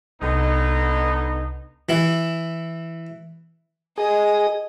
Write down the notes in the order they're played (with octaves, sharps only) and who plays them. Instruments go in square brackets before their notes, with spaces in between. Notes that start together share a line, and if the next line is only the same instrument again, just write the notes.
[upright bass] C2 [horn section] D3 B3 D#4
[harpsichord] E3 E4
[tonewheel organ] G#4 [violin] D#5